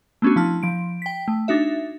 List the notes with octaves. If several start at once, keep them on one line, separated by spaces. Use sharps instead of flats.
A3 B3 C#4 D4 F#4
F3 E4 A5 F6
F3 D7
G5 B6
A3
D4 D#4 F#4 E5